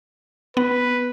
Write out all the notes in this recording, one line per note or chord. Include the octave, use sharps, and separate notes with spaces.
B3 B4